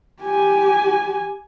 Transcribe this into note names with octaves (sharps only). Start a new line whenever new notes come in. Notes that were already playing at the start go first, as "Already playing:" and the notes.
G4 G#5